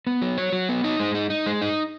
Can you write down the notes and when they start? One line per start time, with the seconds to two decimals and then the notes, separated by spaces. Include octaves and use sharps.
0.07 B3
0.22 F#3
0.38 C#5
0.53 F#3
0.69 B3
0.84 D#4
1.00 G#3
1.15 D#4
1.30 D#4
1.46 G#3
1.62 D#4